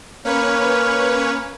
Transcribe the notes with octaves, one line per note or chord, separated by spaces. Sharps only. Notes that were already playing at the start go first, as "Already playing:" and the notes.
A#3 C#4 B4 C#5